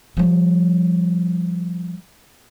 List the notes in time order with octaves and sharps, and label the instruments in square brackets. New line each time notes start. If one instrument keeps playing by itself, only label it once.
[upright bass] F3 G3